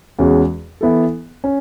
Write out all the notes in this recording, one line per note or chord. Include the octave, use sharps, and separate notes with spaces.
E2 C#3 G#3 C#4 F#4
E3 B3 E4 A4
C#4